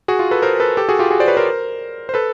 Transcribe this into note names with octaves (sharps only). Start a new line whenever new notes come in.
F#4 G#4
F4
A4 B4
A#4 C5
A4 B4
G4 A4
F#4 G#4
F4 G4
F#4 G#4
C5 D5
B4 C#5
A#4 C5
C5
A4 B4